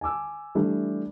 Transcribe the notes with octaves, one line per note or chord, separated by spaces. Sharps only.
G#5 A5 D6 E6
E3 G3 A3 D4